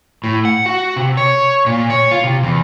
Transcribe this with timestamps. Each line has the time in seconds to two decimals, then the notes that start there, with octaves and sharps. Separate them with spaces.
0.24 A2
0.45 F#5
0.66 F#4
0.96 C3
1.17 C#5
1.66 A#2
1.90 C#5
2.11 F4
2.24 C3
2.43 E2